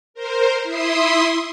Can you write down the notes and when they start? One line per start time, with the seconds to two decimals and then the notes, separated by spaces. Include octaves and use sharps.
0.14 A#4 C5
0.63 E4 E5 C6 D#6